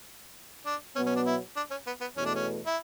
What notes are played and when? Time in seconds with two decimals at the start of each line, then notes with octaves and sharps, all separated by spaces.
0.66 D4
0.96 B2 F#3 B3 C#4
1.06 C#4
1.16 D4
1.26 E4
1.56 D4
1.71 C#4
1.87 B3
2.01 B3
2.17 E2 B2 A3 C#4
2.26 D4
2.35 C#4
2.66 E4